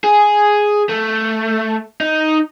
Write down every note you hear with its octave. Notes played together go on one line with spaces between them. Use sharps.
G#4
A3
D#4